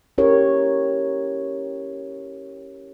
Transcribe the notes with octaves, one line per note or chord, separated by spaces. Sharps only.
C#4 E4 G4 A#4 C#5